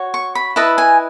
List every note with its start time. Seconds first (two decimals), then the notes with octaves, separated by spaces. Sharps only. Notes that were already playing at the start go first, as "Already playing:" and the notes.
Already playing: F#4 C#5
0.14 C#6
0.35 B5
0.56 E4 B4 D#5 A5
0.78 G#5